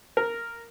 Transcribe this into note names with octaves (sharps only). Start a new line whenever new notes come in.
A#4